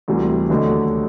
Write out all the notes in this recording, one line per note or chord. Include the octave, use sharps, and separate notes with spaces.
D2 C3 E3 G3
D#2 D3 F#3 A3